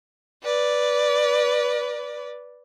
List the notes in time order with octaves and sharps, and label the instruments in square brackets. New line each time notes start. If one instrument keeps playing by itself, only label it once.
[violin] B4 D5